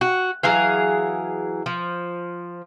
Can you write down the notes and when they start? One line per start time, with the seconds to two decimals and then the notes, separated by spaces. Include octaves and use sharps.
0.01 F#4
0.43 E3 F#3 G#4 F5
1.66 F3